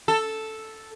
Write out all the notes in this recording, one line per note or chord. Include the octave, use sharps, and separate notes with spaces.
A4